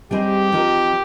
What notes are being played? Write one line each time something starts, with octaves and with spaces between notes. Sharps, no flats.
G3 C4 D#4 G4 G#4 C5
F3 C4 D#4 A#4